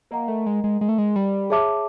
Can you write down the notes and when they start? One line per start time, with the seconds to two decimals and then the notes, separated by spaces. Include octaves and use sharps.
0.11 A#3 A#4 D#5 F#5 A#5
0.28 A3
0.46 G#3
0.64 G#3
0.81 G#3
0.89 A3
0.98 G#3
1.16 G3
1.50 G#4 C#5 E5 A5 D6